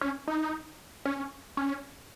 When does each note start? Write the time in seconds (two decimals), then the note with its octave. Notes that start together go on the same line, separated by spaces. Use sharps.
0.01 C#4
0.28 D#4
1.05 C#4
1.57 C#4